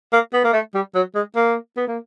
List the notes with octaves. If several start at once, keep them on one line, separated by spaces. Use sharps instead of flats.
A#3
B3
A#3
A3
G3
F#3
G#3
A#3
B3
A#3